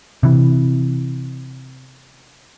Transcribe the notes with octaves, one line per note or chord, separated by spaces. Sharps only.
C3 E3